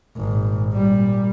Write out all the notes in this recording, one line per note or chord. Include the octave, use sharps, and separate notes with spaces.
G#1 A#2
A#2 G3